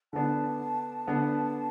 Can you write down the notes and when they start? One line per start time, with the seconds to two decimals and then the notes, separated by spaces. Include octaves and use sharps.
0.13 D3 B3 D4 A5
1.07 D3 B3 D4